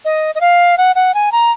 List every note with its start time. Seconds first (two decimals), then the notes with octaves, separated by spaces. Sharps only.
0.05 D#5
0.35 D#5
0.41 F5
0.78 F#5
0.95 F#5
1.14 G#5
1.32 A#5